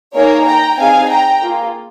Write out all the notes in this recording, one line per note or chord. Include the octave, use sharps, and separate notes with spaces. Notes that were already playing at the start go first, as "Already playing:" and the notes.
A#3 D#4 G#4 A#4 C#5
G5 A#5
C4 D#4 G#4 F5 G#5
G5 A#5
A#3 F4 G#4